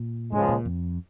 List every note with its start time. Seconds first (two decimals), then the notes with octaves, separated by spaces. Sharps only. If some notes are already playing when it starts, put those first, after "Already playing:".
Already playing: A#2
0.32 C#2 G#2 C#3 F3 G#3
0.49 A#2
0.65 F2